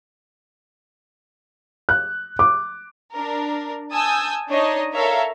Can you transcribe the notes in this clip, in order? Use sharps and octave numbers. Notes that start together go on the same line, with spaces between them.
F#6
D6
D4 A#4
G#5 A5 D#6 E6 G6
D4 D#4 C#5 D#5
A4 A#4 C#5 E5 F5 A#5